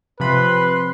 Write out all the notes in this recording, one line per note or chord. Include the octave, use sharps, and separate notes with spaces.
C3 F3 B4 B5 C6 F#6